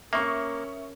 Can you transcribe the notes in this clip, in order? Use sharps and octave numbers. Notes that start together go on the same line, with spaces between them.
A#3 C#4 A#4 E5 C#6 D#6